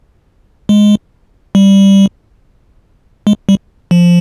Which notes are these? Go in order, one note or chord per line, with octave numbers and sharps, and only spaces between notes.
G#3
G3
G#3
G3
F3